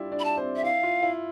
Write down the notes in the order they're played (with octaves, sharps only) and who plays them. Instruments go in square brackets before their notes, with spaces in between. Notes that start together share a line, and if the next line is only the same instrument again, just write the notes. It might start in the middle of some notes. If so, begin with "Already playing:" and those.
Already playing: [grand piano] G3 D4 E4 F4 G4 D5 E5
D4 D5
[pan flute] B5
A5
[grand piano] C4 C5
[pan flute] E5
[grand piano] E4 [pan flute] F5
[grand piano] F4
E4